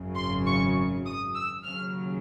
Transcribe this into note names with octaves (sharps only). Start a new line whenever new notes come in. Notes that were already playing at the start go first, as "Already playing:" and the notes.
Already playing: G#1 F#2 C#3
C6
C#6
D#6
E6
D#2 C#3 F#3 F6